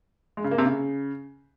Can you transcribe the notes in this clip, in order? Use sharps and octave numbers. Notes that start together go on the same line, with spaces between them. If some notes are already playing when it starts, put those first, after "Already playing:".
G#3
C#3
A#3
C3
C#3